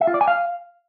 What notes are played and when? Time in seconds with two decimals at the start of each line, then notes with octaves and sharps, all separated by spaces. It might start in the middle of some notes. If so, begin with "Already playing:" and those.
0.01 E5
0.07 F4
0.14 D5
0.21 G#5
0.28 F5